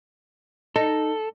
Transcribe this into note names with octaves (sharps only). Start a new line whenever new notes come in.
D#4 A4